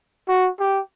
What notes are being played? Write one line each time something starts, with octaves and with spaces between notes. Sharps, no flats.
F#4
G4